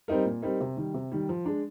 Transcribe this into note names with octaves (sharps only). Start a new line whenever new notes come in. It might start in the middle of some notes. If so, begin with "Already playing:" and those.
G3 C4 D#4 A#4
A#2
G3 C4 D#4 A#4
C3
D#3 G3
C3
D#3 G3
F3
G#3 D4